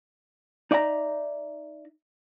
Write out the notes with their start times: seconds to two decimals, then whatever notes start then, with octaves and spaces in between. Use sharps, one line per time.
0.71 D#4 D5 E5 F#5 A#5